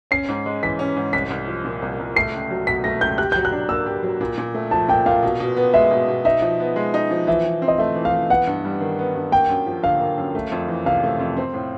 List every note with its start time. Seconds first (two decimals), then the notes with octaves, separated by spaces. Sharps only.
0.11 C#4 C7
0.28 G#2
0.46 G#3
0.63 E3 B6
0.79 C#4
0.96 G#2
1.13 C2 B6
1.30 C2
1.48 F3
1.65 A#2
1.82 C2
1.99 C2
2.16 A3 C7
2.33 C#2
2.50 F#3
2.67 B2 B6
2.84 A3 A#6
3.01 C#2 G6
3.18 G4 F#6
3.32 F#3 G6
3.45 F#6
3.52 D4
3.69 A#3 E6
3.86 G4
4.03 F#3
4.21 A#2
4.38 A#2
4.54 A3
4.71 F3 A5
4.88 A#2 G5
5.06 A#2 F5
5.23 B2
5.40 B2
5.57 B3
5.74 G#3 E5
5.91 B2
6.08 B2
6.25 D#4 E5
6.42 F3
6.60 B3
6.76 G#3
6.94 D#4
7.11 F3
7.27 E3 E5
7.44 E3
7.62 C4
7.68 D#5
7.78 A3 E5
7.96 E3
8.05 F5
8.13 E3
8.30 B3 F#5
8.47 G2
8.65 G3
8.81 D#3
8.99 B3
9.15 G2
9.32 A#3 G5
9.49 F#2
9.67 F3
9.84 D3 F5
10.00 A#3
10.18 F#2
10.35 A3
10.52 F2
10.68 E3
10.86 C3 F5
11.04 A3
11.19 F2
11.37 C4
11.54 A2